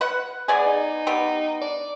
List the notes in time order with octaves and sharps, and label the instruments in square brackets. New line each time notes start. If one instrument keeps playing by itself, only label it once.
[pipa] B4 F#5
[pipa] B3 D5 G#5 [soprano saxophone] G#4
[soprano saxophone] D#4
[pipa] B3 G4
[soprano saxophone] D5